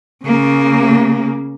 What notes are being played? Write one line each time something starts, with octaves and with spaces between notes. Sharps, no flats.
C#3 A#3